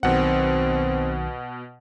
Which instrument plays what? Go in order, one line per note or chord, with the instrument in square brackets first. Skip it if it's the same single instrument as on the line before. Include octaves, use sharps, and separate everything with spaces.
[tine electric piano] B1 D#3 [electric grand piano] B2 F#5 [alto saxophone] C4